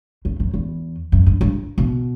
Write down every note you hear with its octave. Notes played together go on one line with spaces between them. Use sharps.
E2
F#2
E2
F#2
G2
G2
B2